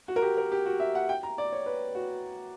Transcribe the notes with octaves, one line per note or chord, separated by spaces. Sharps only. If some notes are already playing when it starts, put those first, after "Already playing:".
F#4
A#4
G4
A#4
G4
F#4
E5
F#5
G5
A#5
D5
C#5
B4
F#4